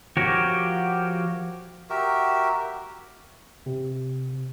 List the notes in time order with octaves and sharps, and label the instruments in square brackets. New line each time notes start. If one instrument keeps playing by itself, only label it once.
[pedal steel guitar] F3 F#4 G4 A#4 C#5
[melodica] F#4 G4 A#4 E5
[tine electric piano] C3